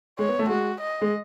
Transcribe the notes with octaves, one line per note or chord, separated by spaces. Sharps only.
G#3 C#5
B3
A3
G#3 F#4
D#5
G#3